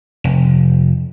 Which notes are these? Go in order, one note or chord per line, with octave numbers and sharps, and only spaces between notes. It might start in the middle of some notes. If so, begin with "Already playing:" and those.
F1